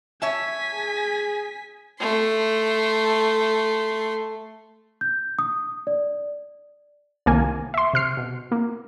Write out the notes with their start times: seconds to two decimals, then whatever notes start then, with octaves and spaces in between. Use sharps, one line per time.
0.22 C#5 E5 G#5 A5 B6
0.74 G#4
2.00 A3 C6
5.01 G6
5.39 D#6
5.87 D5
7.26 C2 D#3 A#3 G#5
7.74 E5 C6
7.94 C3 F6 C7
8.17 B2
8.52 A#3